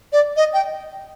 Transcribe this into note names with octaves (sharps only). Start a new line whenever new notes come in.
D5
D#5
G5